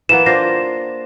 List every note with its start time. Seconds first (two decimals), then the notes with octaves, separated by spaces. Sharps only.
0.09 E3 A#3 B3 E7
0.26 D4 F4 C5 A#6